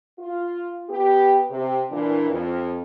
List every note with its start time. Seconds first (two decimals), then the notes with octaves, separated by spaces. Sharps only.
0.19 F4
0.89 B3 G4
1.50 C3
1.90 A#2 E3 D4
2.30 F2